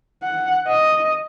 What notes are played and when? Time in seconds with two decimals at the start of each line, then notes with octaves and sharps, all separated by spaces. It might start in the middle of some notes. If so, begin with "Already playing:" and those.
0.24 F#5
0.68 D#5